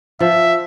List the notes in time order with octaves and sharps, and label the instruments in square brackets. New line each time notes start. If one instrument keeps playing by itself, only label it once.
[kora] F3 [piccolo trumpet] E5